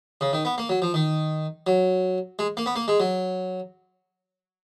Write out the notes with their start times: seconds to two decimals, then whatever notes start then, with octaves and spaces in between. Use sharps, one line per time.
0.21 C#3
0.33 D#3
0.45 B3
0.58 A#3
0.69 F#3
0.82 F3
0.94 D#3
1.67 F#3
2.39 G#3
2.57 A#3
2.66 B3
2.76 A#3
2.88 G#3
3.00 F#3